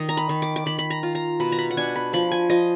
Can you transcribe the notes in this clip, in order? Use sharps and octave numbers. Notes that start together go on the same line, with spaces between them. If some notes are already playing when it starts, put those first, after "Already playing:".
Already playing: D#3 D#5
A#5
B5
D#3
D6
D6
D#3 B5
B5
A#5
F4
A#5
B2 B5
A#5
B5
F#5
D4 G#5
B5
F3 B5
G#5
F3 D#5